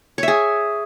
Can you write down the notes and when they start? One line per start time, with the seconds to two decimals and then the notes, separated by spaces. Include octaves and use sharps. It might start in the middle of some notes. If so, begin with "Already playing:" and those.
0.18 C#5
0.23 E5
0.28 G#4